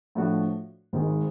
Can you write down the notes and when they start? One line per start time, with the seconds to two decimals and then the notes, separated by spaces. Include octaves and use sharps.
0.15 A2 F3 A3 D4 F#4
0.93 G#1 G#2 D#3 G#3